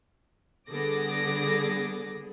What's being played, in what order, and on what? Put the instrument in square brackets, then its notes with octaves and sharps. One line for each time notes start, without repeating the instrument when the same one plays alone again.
[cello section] D3 G3 [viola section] B3 G#4 A4 [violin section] D6 A#6